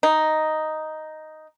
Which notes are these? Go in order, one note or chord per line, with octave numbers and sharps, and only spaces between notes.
D#4